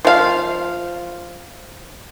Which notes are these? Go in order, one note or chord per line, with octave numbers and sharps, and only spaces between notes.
F3 F5